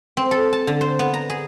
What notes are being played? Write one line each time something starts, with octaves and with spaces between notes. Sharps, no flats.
C4
A4
A5
D3
C5
B3
A#5
G#4